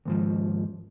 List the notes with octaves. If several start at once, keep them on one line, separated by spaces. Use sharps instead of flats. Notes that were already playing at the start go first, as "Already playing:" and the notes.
D#2 G#2 F3